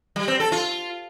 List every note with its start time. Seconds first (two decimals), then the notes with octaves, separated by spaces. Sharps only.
0.16 G3
0.28 C4
0.40 A4
0.52 F4